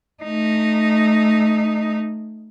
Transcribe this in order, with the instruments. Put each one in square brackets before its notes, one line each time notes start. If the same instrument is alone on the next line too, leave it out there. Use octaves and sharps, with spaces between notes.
[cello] A3 D#4